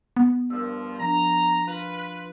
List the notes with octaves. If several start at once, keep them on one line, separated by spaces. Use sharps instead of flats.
B3
G2 F3 A#4 E6
F3 D4 A#5
F4 B4